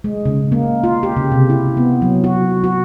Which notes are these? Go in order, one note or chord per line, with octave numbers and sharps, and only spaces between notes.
G#3
C#3
A#3
F4
G4
C#3
C3
E4
B3
F#3
F#4
F#4